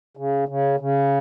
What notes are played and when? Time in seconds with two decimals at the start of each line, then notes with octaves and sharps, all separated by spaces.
0.17 C#3
0.48 C#3
0.80 C#3